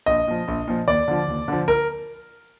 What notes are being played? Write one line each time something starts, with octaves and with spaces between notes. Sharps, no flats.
A#1 D#5
A#2 F3
A#1
A#2 F3
D#2 D5
D3 F3
D#2
D3 F3
A#4